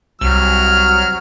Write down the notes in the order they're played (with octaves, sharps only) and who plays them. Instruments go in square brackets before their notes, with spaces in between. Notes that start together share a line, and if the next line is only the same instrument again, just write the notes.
[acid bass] C2 [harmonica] F#3 F6